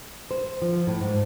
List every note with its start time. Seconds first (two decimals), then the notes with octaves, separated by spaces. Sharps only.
0.31 C5
0.62 F3
0.87 A2
1.00 G#2